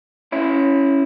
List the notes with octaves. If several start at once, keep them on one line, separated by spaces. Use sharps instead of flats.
C#4 E4